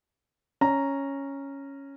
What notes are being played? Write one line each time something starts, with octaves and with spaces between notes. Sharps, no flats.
C#4 A#5